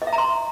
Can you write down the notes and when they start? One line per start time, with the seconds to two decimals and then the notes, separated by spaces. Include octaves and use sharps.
0.02 D#5
0.07 E5
0.13 A#5
0.18 C6